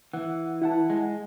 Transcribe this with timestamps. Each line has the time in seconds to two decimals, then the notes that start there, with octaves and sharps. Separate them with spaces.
0.14 E3 F#5
0.62 E4 F#5 A5
0.90 G#3